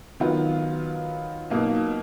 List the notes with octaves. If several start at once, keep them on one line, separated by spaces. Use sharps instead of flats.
D#3 F#3 B3 F4
B2 F#3 A#3 D#4